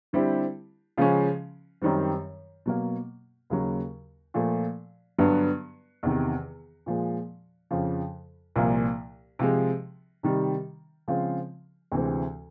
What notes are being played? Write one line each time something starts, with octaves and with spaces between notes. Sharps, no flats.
D3 G3 C4 E4 G4
C#3 F3 G#3 C#4
F#2 D#3 G3 C4
B2 F#3 A#3
D#2 C#3 F#3
A#2 F3 A3
G2 D3 F#3 B3
E2 C3 D#3
A#2 F3 G#3
F2 C#3 F3
C2 A#2 F3 A#3
C3 F3 G#3
C3 D#3 G3
C#3 F3 G#3 C4 F4
D2 C3 E3 G#3 C4